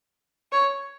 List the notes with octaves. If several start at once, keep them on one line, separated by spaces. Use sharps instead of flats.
C#5